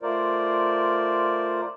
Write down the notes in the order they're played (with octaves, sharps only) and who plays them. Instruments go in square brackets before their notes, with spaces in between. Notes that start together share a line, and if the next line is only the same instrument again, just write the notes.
[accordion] A3 F4 A#4 C5 D5